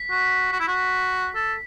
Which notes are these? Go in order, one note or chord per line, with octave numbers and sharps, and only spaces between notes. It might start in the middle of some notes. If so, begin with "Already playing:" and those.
Already playing: B6
F#4
F#4
E4
F#4
A4